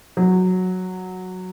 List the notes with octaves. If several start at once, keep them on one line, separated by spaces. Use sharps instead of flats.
F#3